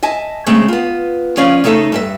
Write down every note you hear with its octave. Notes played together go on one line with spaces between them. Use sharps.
D#5 E5 G#5 A5
C#3 G#3 A3 C4
B3 F4
F3 C#4 D5 F5
C#3 A3 D#4 A4 E5
G2 G#4 E5